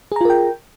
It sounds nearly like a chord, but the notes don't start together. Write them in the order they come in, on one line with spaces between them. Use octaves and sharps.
G#4 A#5 F4 A#4 G5